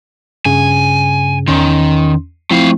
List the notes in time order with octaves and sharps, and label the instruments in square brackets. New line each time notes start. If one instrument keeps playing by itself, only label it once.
[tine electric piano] G2 C#3 [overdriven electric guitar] G#5
[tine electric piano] E2 C#4 C6 [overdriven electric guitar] D#3
[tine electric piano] F3 C4 E4 [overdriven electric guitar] A3 F5